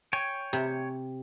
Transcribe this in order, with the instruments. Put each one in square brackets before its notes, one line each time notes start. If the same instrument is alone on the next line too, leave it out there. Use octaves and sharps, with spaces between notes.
[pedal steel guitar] C#5 G5 G#5
[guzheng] C3